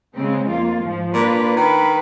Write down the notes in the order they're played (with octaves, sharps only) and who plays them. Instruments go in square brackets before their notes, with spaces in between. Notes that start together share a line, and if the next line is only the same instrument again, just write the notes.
[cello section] C#3 G#3 C4
F2 A#3 F4
G#2 F3
[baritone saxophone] A#2 [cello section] D4 F4 B4
[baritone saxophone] D#3 [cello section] B4